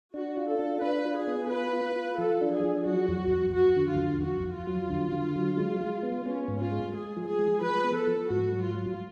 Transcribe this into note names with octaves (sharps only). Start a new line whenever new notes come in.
D4 F#4
F4
A4
D4
D4 B4
F4
G#4
B3
F4 B4
F4
F4
F3 A4
D4
G#4
F3
F#3 F#4
F2
F2
F2 F#4
D3
F4
F2
F2 F#4
F2
F4
F#3
D3
D3
F#3
G#3
G#3
B3
B3 C#4
G#2
F4
G#3
G#3 G#4
F3
G#4
G#3
F3 B4
B3
A4
F3
G#2 F#4
F#3
F4
F#3